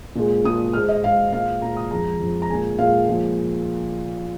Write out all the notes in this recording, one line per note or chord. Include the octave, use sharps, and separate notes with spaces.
A#2 G#3
A#2 G#3 D#6
G#2 G#3 F6
D#5
G#2 G#3 F5
A#2 G#3 F5
A#2 G#3 A#5
D#6
F2 F3 G#3 A#5
F2 F3 G#3
A#5
A#2 G#3 G#5
A#2 G#3 F5
A#2 F3 G#3